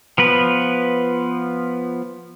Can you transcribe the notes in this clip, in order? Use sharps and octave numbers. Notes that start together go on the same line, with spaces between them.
F3 B3 B4